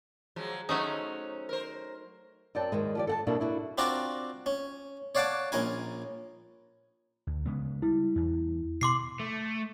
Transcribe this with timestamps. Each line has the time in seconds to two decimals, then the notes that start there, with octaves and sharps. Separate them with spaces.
0.36 F3 F#3 G#3
0.69 F#3 A3 C#4 D#4 C5
1.49 A#4 C5
2.55 F#2 C4 D5 F#5 G5 A5
2.72 D#2 G#2 D#3 G#3
2.95 F3 G4 D5
3.07 A4 F#5 A5
3.27 B2 G3 A#3 D4 E4 F#4
3.40 D4 E4 F#4
3.78 C4 D4 F4 F#4 D5 A#5
4.46 C#4
5.15 C#5 D5 F5 F#5 A5 D6
5.52 A#1 C#4 A#4 G#5
7.27 D2
7.46 C#3 G#3 B3
7.82 G3 E4
8.16 E2
8.81 B2 C6 D6 C7
9.20 A3